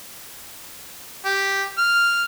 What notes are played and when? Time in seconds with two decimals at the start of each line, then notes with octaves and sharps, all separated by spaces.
1.25 G4
1.78 F6